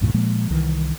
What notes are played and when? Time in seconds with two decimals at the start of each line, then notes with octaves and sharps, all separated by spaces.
0.01 C2 G2 A#2 D3
0.14 A#2 F3 G#3 A#3
0.50 C2 D#3 E3